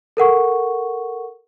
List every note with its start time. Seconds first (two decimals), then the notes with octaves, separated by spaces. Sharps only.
0.17 A4 A#4 F#5 C#6